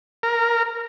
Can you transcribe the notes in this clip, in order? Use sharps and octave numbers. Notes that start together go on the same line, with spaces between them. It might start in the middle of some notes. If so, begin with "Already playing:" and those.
A#4